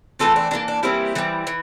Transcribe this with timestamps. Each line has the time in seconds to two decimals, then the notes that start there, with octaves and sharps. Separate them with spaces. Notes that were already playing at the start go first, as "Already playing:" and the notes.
0.19 E3 A3 C4 F4 A4
0.36 D4
0.51 E3 G3 A#3 D4
0.68 D4
0.83 E3 G3 A#3 C4 E4
1.15 E3 G3 C4
1.47 E3